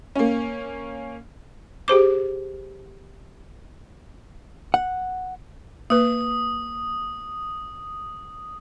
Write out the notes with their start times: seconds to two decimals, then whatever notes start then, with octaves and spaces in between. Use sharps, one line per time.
0.15 A#3 C#4
1.88 G4 G#4 C5 D6
4.74 F#5
5.90 A#3 B4 D#6